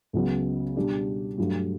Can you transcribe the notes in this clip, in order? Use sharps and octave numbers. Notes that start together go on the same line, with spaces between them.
C#2 C#3 F#3 B3
B2 G3 D4 G4
G2 F#3 A3